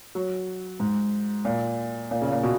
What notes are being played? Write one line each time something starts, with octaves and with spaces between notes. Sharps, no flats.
F#3
G#2
A#2
A#2
C#3
A#2
B2